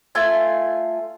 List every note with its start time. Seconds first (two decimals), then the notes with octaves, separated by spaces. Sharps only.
0.15 A3 F4 G#5